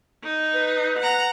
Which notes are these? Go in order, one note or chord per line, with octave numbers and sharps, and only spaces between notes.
D#4
B4
F#5 A#5